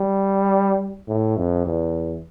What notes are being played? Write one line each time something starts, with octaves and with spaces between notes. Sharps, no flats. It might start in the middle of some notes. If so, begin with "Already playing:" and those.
Already playing: G3
A2
F2
E2